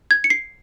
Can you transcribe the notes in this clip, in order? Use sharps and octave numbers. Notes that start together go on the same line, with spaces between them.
G#6
C#7
C7